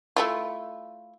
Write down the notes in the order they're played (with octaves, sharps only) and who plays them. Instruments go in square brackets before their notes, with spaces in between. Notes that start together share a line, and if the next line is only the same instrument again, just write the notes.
[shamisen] A3 E4 F4